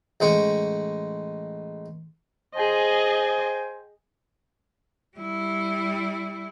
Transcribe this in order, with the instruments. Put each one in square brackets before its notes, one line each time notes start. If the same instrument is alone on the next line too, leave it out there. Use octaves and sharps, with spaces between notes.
[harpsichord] A1 G#3 C5 C#6
[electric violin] G#4 D#5 [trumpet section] C5 G5 G#5
[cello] G3 E4